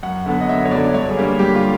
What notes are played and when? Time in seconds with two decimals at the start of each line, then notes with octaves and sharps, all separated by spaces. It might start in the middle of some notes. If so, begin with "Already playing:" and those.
0.03 F#2 F#5
0.26 D3 F#3 B3
0.41 D#5
0.48 F#2 E5
0.65 C#5
0.71 D3 F#3 B3 D5
0.94 G2 C#5
1.09 G#4
1.17 D3 G3 A#3
1.25 G#4
1.39 G2 G4
1.55 F4